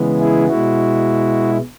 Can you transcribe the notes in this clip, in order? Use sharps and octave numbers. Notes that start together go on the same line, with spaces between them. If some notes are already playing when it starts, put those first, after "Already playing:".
Already playing: C#3 E3 G#3 B3
E4 G#4
B2 G#3 E4 F#4